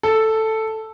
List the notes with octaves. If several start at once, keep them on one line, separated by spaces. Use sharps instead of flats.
A4